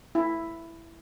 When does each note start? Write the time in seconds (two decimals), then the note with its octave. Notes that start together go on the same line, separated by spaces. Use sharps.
0.15 E4